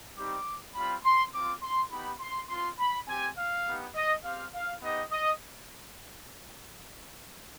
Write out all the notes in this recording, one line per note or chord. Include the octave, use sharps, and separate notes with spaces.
G3 C4 D#4 G4 D6
G3 C4 F4 B5
C6
C4 F4 D6
C6
B3 D#4 G4 B5
C6
C4 F4 C6
B5
C4 G4 G#5
F5
B3 D#4 G4
D#5
C4 G4 F5
F5
B3 D#4 G4 D#5
D#5